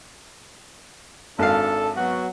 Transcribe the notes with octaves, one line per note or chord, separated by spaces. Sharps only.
G#1 D4 A4 F5
F#3 B3 F#4